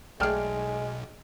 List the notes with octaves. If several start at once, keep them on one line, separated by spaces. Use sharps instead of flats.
B1 G#3 A3 G#4 D5 G5 F6